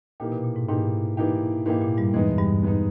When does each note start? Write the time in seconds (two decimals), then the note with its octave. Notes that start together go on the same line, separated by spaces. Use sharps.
0.20 A#2 E3 A#3 D#4 G4
0.32 B2
0.44 A#2
0.56 G#2
0.69 G#2 E3 A#3 D#4 G4
1.17 E3 A#3 D#4 G4
1.66 G#2 E3 A#3 D#4 G4
1.82 A#2
1.97 G2 G3
2.14 E2 E3 G#3 B3 D#4
2.38 G2 G3
2.63 G#3 B3 D#4